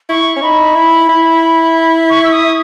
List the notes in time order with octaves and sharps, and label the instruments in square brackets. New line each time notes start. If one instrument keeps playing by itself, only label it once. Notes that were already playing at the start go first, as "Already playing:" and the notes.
[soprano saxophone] E4 [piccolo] C#6
[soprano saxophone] C#4
[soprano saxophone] D#4 [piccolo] B5
[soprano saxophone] E4
E4
[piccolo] C#6
E6
D#6